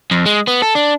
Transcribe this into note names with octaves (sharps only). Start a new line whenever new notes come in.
F2
G#3
B3
A4
D4